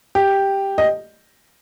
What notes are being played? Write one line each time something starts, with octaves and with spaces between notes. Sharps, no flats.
G4
D#5